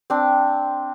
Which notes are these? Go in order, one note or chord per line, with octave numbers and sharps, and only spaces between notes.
C4 D4